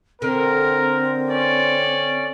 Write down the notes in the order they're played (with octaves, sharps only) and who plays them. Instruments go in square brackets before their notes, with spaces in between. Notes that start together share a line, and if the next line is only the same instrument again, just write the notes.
[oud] D3 [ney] C4 [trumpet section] A#4
[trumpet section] C#4 D5